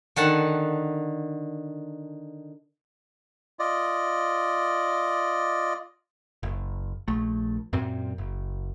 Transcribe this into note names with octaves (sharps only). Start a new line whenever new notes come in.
D3 D#3 F#5 A5
F4 D5 D#5
F#1
A#1 A3
F#2 A#2 C4
F#1